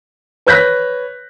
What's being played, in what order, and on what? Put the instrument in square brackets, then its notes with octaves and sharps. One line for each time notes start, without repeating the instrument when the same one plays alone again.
[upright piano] B4 C#5 F#6 G6 A#6 B6